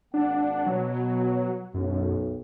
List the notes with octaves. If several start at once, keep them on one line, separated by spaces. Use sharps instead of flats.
G#1 A#3 D4 F#5
B2 F#3
B1 F#2